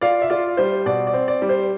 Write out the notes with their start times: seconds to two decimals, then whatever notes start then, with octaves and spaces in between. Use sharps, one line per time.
0.01 F4 D5 F5
0.22 E5
0.30 F4 D5
0.57 G3 C5
0.86 B2 D5
1.07 D5
1.13 C4
1.28 D5
1.42 G3
1.49 C5